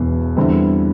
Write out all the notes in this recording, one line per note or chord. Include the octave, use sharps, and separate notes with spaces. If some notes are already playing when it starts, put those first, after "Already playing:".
Already playing: E1 E2 B2
E2 D3 G3 C4 E4